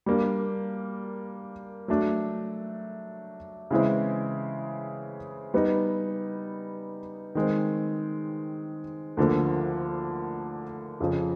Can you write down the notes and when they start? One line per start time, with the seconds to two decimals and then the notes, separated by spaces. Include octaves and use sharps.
0.06 G3 A#3 D4
1.88 F#3 A3 D4
3.71 C#3 E3 G#3 C4 E4
5.54 G3 B3 D#4
7.35 D#3 G#3 C4
9.17 D2 D3 F3 A#3
11.00 F2 C#3 F3